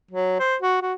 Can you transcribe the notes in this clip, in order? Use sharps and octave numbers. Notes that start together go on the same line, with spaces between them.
F#3
C5
F#4
F#4